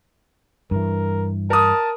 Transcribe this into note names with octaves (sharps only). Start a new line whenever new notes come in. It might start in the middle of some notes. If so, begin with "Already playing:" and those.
G2 E3 A#4
A#4 A5 D#6